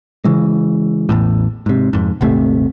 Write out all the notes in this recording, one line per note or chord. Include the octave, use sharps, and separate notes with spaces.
C#3 E3 G#3
A1 E2 A2
G#2 C3
F2 G#2
D#1 G#1 C3 A3